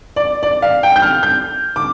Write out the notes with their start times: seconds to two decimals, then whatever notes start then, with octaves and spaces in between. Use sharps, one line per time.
0.16 D5
0.43 D5
0.62 F5
0.83 G5
0.96 G6
1.02 F6
1.23 G6
1.76 D6